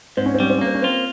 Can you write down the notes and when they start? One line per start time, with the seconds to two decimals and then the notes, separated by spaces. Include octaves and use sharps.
0.17 G#2 C4
0.26 C#4
0.34 C4
0.40 G3 C#4
0.50 C4
0.58 C#4
0.61 A#3
0.67 C4
0.74 C#4
0.82 C4 F4